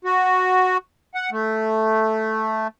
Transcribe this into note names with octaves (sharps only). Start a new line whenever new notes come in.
F#4
F#5
A3